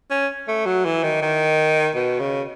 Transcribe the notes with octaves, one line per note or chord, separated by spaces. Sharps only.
C#4
A3
F#3
E3
D#3
D#3
B2
C#3